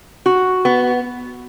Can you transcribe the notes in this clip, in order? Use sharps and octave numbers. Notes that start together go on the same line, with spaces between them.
F#4
B3